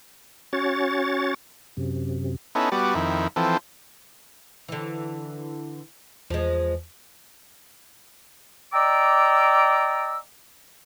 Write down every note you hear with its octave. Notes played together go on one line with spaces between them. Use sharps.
C#4 F#4 C#5 A6
F#2 C3
B3 C#4 D#4 E4 A4
G3 B3 F#4 D5
F2 D#3 E4
E3 F3 C4 A4
D3 E3
E2 F3 G#3
D5 D#5 G5 A#5 D6 E6